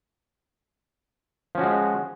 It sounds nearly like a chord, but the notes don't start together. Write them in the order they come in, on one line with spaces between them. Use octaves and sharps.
F3 C#4 F#4 G#3